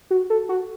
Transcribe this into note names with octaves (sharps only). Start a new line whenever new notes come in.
F#4
A4
F#4